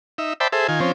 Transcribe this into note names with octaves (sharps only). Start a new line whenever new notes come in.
D#4 E5
C5 D5 E5 G5 A5 B5
G#4 A4 C5 E5
D#3 F4 G#5
F3 C4 C#4